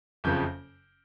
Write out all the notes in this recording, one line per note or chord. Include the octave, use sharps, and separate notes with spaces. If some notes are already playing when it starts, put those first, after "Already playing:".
F#1 F2 C#3 F3 G6